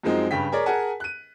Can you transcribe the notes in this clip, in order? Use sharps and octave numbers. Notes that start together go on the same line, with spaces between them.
F#2 F3 G#3 C4 D#4
G2 C#3 G5 B6
G#4 A#4 C#5 D5
G#4 A#4 F#5 G#5 A5
F#6 D#7